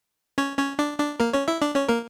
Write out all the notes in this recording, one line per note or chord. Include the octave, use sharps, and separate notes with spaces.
C#4 C#5
C#4 C#5
D4 D5
D4 D5
A#3 A#4
C#4 C#5
E4 E5
D4 D5
C#4 C#5
A#3 A#4